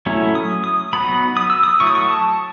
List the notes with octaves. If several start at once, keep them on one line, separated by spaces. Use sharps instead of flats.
F#3 A3 C#4 E4
D#6
D#6
F#3 B3 D#4 B5
D#6
E6
D#6
F#3 A3 E4 C#6
D#6
C#6
A5